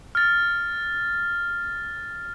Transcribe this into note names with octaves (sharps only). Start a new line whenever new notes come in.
F6 A6